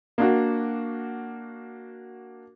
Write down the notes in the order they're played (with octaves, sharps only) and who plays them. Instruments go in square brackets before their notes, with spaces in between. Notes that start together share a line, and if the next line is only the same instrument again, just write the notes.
[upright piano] A#3 D4 F#4